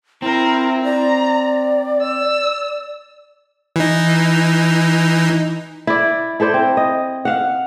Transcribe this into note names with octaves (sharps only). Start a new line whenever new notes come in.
C4 E4 A#4
D5 A#5
E6
E3 D#4
E4 D5
E4 A4 C5 D5
C4
D#5
F5 F#5